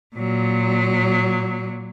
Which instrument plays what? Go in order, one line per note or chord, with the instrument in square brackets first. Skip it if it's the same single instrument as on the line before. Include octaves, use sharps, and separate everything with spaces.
[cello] A#2 F#3